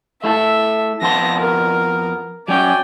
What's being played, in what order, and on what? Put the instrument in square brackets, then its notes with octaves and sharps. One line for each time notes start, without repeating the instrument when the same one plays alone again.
[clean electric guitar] A3 E4 A4 [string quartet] E5
[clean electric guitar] F2 B3 C6 [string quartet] A5 A#6
[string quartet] A#4
[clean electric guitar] F#3 C#4 C#5 [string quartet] D5 G5 G#5